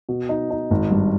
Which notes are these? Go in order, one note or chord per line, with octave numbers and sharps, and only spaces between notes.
B2
D#4
D#4
G#1
G2